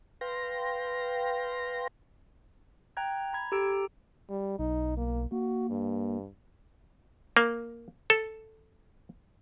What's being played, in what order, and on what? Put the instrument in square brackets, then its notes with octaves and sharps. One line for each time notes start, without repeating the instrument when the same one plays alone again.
[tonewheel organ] B4 F5 G5 C6 A#6
[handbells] G5 A#5 F#6 G#6
A#5 B5 G#6
G4 A4 A#5 E6 D7
[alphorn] G3
[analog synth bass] B1 [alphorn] D#4
[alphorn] A#3
[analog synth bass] A#3 [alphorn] F#4
[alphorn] G2
[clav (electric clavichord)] A#3
A4